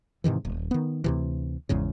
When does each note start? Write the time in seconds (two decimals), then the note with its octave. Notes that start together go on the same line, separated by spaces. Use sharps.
0.24 G#2 C3 D#3 E3
0.45 D#1
0.71 D#3 B3
1.04 D2 C3 E3
1.69 G#1 E2 G#2 C#3